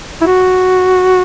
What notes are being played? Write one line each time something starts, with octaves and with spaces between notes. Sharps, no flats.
E4
F#4